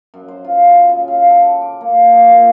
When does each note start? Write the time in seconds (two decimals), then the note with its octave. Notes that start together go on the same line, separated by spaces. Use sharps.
0.14 F#2
0.28 C5
0.44 F4
0.89 C#3
1.08 F5
1.30 A4
1.62 D6
1.81 A#3
2.13 F3
2.32 A#2